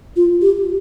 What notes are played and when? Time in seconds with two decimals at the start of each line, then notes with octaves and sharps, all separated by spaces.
0.16 F4
0.42 G4